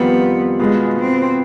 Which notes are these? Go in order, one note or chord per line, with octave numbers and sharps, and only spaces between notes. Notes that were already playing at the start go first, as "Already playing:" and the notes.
Already playing: F2 D#3 G3 B3 C4 F4
B2 G#3 B3 F4 G#4
C4